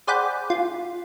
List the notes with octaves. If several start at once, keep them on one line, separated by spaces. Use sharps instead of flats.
G#4 C5 D5 F#5 G5 B5
F4